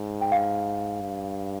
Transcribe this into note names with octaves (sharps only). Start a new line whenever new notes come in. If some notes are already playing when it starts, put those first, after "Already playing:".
Already playing: G#2
G5
F5
G2